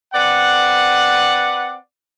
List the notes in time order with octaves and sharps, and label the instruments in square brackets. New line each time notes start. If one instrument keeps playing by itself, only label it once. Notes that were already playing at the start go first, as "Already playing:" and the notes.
[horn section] C4 B4 D5 F#5